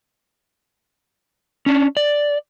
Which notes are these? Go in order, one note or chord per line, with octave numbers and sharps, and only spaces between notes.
C#4 D4
D5